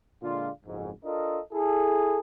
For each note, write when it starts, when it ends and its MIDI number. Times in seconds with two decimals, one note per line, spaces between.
0.22 0.49 46
0.22 0.49 50
0.22 0.49 56
0.22 0.49 62
0.22 0.49 65
0.66 0.90 30
0.66 0.90 41
0.66 0.90 44
1.04 1.40 62
1.04 1.40 65
1.04 1.40 69
1.04 1.40 70
1.04 1.40 75
1.53 2.20 64
1.53 2.20 68
1.53 2.20 69